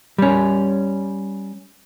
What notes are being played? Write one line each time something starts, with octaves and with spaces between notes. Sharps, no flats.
G3 C#4